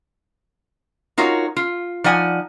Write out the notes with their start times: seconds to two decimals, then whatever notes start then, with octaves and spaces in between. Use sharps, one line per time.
1.18 D#4 F4 F#4 A#4 C#5
1.57 F4
2.04 F3 D#4 D5 F#5 G#5